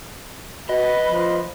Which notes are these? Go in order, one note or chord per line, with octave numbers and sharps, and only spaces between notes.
F#4 B4 D#5
F3